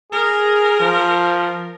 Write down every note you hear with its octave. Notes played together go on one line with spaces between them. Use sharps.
G#4 A#4
F3